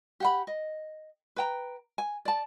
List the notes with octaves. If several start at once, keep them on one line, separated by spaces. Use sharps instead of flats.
G4 F#5 B5
D#5
B4 G5 A#5
G#5
D5 A5